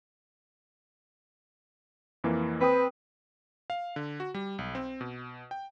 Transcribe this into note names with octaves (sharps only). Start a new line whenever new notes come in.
F2 E3 A#3
C4 B4 G5 D#6
F5
D3
F#4
G3
B1
C4
B2
G5